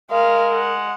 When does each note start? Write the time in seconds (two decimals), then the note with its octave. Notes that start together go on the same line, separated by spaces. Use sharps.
0.11 G#3 A#4 F5
0.53 F#5